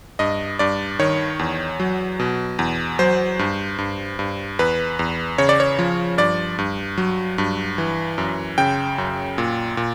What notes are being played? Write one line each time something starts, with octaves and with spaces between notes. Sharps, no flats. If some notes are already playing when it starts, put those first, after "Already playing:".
G2 D#5
G2 D5
D#3 C#5
E2
F#3
B2
E2
F#3 C5
G2
G2
G2
E2 B4
E2
C#3 C#5
D5
C#5
F3
G2 D5
G2
F#3
G2
E3
F#2
C#3 G5
F#2
A#2
A#2